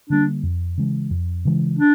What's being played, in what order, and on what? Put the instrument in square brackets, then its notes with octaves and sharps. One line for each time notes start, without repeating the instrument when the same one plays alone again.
[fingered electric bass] D3 G3 A#3 [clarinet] D4
[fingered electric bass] F2
C#3 E3 G#3
F2
C#3 E3 G#3
[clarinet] D4